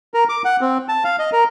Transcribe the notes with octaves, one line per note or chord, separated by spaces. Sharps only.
A#4
D6
F#5
C4
A5
F5
D#5
A#4